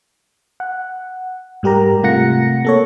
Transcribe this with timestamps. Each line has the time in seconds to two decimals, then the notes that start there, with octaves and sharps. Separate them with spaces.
0.60 F#5
1.63 G#2 G3 G4 A#4 A#5
2.03 C3 A3 F4 F#5 A#6 C#7
2.65 A#3 A4 C#5